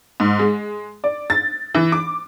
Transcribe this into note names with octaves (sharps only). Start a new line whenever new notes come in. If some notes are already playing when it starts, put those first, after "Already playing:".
G#2
G#3
D5
A6
E3
D6